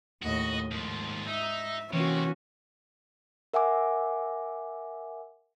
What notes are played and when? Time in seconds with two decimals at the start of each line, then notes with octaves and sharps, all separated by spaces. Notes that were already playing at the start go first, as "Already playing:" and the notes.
0.22 D#2 A2 F#4 D#5
0.71 D#2 G#2 F3
1.27 D#4 E5
1.93 C3 E3 A#3 C#4 F#4
3.54 A#4 E5 F#5 G#5 D6